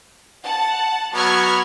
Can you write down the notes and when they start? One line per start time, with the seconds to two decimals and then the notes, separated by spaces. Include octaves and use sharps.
0.43 F#5 A5
1.14 F#3 B3 C#6 F6 G#6